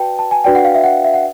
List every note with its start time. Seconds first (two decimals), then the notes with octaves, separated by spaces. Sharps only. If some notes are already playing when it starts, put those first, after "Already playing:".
Already playing: F#4 B4 D5 G5 A5
0.19 A5
0.31 G#5
0.44 D4 F#4 B4 D5 G5
0.55 F#5
0.65 F5
0.75 E5
0.84 F#5
1.04 E5
1.14 F#5